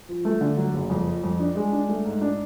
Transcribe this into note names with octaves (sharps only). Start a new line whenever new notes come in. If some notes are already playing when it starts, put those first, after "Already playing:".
F3
A3
D3
F#3
F#1
F2
F3
F2
D4
G#3
D4
A3
G#2
D4